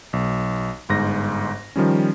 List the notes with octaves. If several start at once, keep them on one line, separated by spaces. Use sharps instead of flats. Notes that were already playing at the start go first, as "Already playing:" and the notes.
B1
G1 G#2 A#6
D#3 F3 G3 C#4